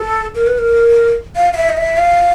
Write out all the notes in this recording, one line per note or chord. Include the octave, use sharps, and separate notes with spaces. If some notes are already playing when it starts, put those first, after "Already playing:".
Already playing: A4
A#4
B4
A#4
F5
F5
E5
D#5
E5
F5